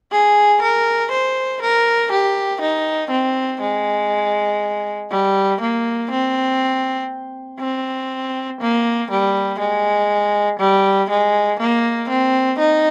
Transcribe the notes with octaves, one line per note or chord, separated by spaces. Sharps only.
G#4
A#4
C5
A#4
G4
D#4
C4
G#3
G3
A#3
C4
C4
A#3
G3
G#3
G3
G#3
A#3
C4
D#4